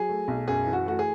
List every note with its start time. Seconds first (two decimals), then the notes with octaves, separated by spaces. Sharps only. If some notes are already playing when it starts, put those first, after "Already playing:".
Already playing: F#3 G#4
0.09 A3
0.28 B1
0.48 F#2 G#4
0.67 E3
0.73 F#4
0.86 A3 F#4
0.99 G#4